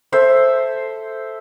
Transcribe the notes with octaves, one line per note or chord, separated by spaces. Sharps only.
A4 C5 E5